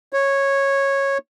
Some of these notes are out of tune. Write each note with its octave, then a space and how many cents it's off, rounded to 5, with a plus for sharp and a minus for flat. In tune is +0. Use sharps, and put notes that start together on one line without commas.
C#5 -10